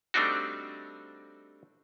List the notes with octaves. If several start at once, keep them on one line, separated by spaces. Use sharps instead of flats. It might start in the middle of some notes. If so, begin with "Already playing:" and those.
G3 A3 C4 D4 D#4 F#4